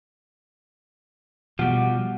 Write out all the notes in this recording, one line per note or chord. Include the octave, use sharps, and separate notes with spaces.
B2 F3 G3 F#4